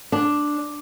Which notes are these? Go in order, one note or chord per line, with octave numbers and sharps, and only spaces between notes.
D4